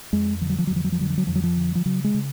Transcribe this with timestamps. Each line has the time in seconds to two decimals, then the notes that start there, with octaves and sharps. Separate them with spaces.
0.13 F2 G#3
0.41 D3 F3
0.49 F#3
0.58 F3
0.67 F2 F#3
0.76 F3
0.84 F#3
0.92 F3
0.99 D3 F#3
1.10 F3
1.17 F#3
1.27 F2 F3
1.35 F#3
1.43 F3
1.56 D3
1.75 F3
1.85 C#3 F#3
2.04 G#3
2.14 C#3